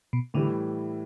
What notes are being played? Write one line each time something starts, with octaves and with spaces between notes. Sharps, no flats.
B2
A2 D3 E3 G3